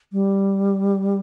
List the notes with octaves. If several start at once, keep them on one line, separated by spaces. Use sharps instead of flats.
G3